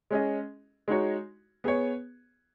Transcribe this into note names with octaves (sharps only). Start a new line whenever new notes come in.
G#3 C#4 G#4 D#5
G#3 D#4 F#4 C#5
B3 G#4 C#5